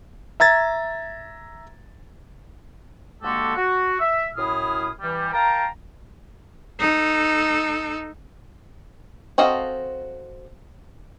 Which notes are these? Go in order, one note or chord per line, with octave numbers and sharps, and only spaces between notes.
E5 A#5 G#6 A6
D3 G#3 A#3 F#4 G4 A4
F#4
E5
F#2 A2 E4 G#4 D#6 F6
E3 G3
A#4 F5 G5 A5 A#5
D#4 A4
C4 F#4 A4 D#5 F5